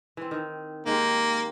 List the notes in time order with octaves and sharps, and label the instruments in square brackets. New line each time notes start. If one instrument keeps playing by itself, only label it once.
[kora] E3 C4
D#3
[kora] D#3 G#3 G4 [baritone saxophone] A#3